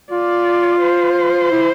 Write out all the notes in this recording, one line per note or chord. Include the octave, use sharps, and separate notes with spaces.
F4 D5
C5
E4